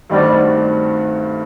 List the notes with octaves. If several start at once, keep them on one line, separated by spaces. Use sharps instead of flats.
G2 D#3 G3 A3 C4 F#4